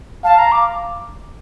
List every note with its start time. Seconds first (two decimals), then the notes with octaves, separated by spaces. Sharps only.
0.24 F5 A5
0.38 A#5
0.52 D6